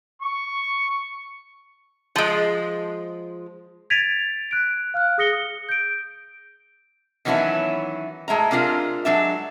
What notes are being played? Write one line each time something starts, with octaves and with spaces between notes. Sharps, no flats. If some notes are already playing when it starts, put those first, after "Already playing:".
C#6
F3 G#3
G#6 A6 B6 D7 D#7 F7
F#6 D7
F5 F6 F#6
G#4 D#6 A#6 C#7 G7
D#6
G6 D7
D#3 E3 F#3 B3 C#4 E4
A2 G#3 E5 A#5
C3 G#3 D4 F4 A#4 F5
F#3 G#3 D4 E5